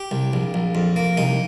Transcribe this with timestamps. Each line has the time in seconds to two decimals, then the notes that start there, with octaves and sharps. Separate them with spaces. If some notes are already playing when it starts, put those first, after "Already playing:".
Already playing: G4
0.11 C2
0.33 A#1
0.54 A#1
0.75 F2
0.96 A#3
1.17 C2 D#4